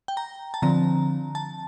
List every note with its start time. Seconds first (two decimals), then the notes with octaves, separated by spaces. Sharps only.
0.08 G5
0.17 A#5
0.54 A5
0.62 D3 F3 C4 A#5
1.35 A5